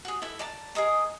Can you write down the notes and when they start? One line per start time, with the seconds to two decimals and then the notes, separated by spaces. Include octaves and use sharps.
0.05 F#4 G#4
0.22 E4 A4 E5
0.39 D5 A5 A#5
0.75 G#4 A#4 D#5 A#5